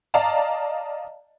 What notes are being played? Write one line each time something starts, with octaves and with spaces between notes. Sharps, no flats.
D5 D#5 F5 A5 A#5